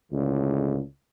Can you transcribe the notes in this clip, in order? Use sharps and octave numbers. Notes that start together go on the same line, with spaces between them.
C#2 A2 D3